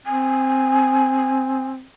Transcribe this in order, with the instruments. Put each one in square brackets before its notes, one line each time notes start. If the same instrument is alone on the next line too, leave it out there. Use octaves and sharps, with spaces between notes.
[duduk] C4 [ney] G#5